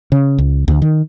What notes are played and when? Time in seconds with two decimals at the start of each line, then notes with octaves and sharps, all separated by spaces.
0.12 C#3
0.38 C#2
0.68 D2
0.82 D#3